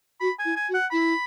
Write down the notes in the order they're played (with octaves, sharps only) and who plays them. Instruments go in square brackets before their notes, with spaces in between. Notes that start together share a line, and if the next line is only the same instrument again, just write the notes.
[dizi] F#4 [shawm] B5
[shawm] G#5
[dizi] E4
[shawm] G#5
[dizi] F#4
[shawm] F#5
[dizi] E4 [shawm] B5